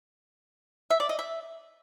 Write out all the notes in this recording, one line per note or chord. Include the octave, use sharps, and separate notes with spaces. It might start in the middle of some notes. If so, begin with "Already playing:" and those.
E5
D5
D#5
E5